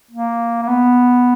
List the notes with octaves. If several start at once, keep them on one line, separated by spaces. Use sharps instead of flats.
A#3
A#3
B3